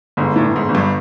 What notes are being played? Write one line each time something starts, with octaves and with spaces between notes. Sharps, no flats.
G1 G#2
A2
G1
G#2
G1
G2